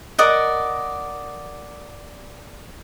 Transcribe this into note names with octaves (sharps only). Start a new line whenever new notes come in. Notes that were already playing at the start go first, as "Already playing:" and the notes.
A#4 D5 D#5 F#5